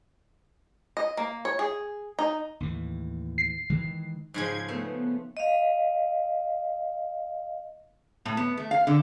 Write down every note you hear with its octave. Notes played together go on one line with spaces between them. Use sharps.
D#5
A#3
C#5
G#4
D#4
D#2 A2 E3
C7
D#3 E3 G#3
G#2 C#3 F3 G#4 G#6
A3 B3
D#5 F5
A2
B3
A3
F5
D3